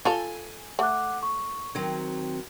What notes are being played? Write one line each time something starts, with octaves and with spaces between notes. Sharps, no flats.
F4 A4 G#5 A#5
A3 F#5 D6 F#6
C#6
D#3 F#3 C4 G#6